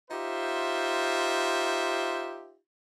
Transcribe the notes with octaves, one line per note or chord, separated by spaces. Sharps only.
D#4 F4 G4 C5 E5